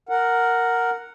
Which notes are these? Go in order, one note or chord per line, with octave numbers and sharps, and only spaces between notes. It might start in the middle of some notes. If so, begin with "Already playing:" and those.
A#4 F#5